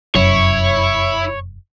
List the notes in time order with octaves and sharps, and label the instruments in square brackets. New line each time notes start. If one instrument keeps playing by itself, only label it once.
[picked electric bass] F1 F#2 [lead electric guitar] E4 [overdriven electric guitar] C#5